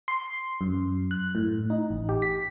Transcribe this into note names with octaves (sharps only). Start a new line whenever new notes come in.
C6
F#2
F#6
A2
D#4
A1
G4
B6